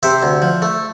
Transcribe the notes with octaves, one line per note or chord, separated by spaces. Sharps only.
C3 C5 E5
D2
F3
A3